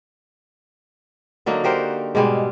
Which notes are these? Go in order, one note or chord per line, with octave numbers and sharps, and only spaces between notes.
D3 F#3 A#3 D#4
F#4 G4 A#4 C5
G#2 B2 G3 G#3